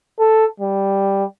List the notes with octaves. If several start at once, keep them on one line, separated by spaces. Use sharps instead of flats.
A4
G3